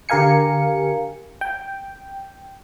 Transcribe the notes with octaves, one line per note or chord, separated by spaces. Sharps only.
D3 G4 A#4 F5 G#5 C#7
G5